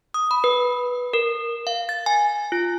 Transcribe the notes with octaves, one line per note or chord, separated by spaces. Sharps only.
D#6
B5
B4
A#4
F5
A6
G#5
F4